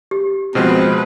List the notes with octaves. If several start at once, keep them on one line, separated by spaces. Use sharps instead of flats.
G4
B2 F3 G#3 C4 B4